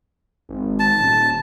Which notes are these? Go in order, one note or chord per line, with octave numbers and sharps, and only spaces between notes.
G#1
A5
D#1